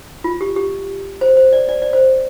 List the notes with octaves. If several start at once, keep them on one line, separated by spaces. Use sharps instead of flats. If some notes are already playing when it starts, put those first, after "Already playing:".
F4
G4
G4
C5
C5
D5
D5
D5
C5